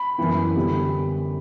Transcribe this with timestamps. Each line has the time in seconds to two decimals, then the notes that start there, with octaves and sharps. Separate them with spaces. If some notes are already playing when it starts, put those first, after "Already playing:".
Already playing: B5
0.18 F#2 E3 B3
0.56 D3 G3 B3